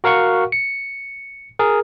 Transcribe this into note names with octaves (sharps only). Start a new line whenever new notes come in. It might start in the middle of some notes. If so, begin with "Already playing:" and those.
F#4 A#4 F5 F#5 C#6
C#7
G#4 A#4